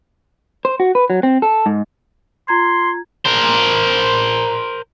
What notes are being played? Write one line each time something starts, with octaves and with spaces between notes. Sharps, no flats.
C5
F#4
B4
F#3
C4
A4
G#2
F4 A#5 C6 G#6
A#4 C5